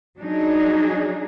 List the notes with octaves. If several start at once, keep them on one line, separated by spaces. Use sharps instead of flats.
F#3 D4 D#4 G#4